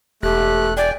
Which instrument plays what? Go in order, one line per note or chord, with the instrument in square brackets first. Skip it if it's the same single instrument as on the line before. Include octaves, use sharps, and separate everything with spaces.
[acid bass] E1 [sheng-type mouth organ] A3 F#6 [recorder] G4
[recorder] D5 [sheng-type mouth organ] G5 G#5